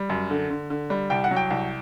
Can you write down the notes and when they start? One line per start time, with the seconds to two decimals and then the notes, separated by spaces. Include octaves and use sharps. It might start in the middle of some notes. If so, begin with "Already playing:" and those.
Already playing: G3
0.10 F#2
0.30 D3
0.50 D3
0.70 D3
0.90 G3
1.10 C2 G5
1.24 F#5
1.31 F#3
1.36 G5
1.51 C2